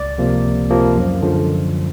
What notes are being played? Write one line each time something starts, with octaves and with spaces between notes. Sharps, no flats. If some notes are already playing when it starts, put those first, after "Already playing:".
Already playing: C#2 D5
C3 F3 A#3
C#2
C3 F3 A#3
F#2
D3 F3 G#3